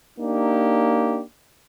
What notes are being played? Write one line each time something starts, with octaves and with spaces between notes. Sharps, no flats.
A#3 D4 D#4 G4